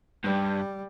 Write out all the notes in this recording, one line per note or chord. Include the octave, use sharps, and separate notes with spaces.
G2 G3